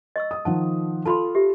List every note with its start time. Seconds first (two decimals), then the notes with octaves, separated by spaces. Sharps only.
0.16 D#5 C#6 E6
0.31 D#6
0.45 D#3 F3 F#5 A5
1.06 F4 A4 A5 B5 C6
1.35 G4 E5